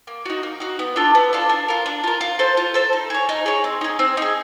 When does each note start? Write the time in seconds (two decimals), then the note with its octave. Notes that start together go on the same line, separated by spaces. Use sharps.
0.07 A#3
0.25 D#4 F#4
0.43 A#3
0.60 D#4 F#4
0.79 B3
0.96 D4 F4 A4
1.15 B3
1.33 D4 F4 A4
1.49 D4
1.68 F4 A#4
1.86 D4
2.04 F4 A#4
2.21 F4
2.39 A4 C5
2.57 F4
2.74 A4 C5
2.93 D#4
3.10 G#4 C#5
3.29 D#4
3.46 G#4 C#5
3.64 C4
3.81 D#4 G#4
3.99 C4
4.17 D#4 G#4